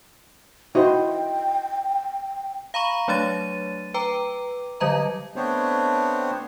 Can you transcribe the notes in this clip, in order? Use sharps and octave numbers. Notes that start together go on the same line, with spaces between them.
D#4 E4 F#4 C5 G5
F5 A#5 B5 C#6
F#3 A3 D4 C#5 A6 D#7
B4 G5 A#5 D6
D3 F#3 G3 D#5 A#5
A3 B3 C4 D4 C5 C#5